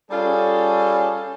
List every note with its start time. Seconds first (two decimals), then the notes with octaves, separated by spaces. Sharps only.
0.11 G3 C#4 F4 G#4 A4